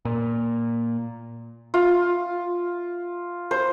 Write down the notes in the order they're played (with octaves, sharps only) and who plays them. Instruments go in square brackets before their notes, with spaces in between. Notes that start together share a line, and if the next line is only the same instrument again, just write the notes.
[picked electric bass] A#2
[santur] F4
C5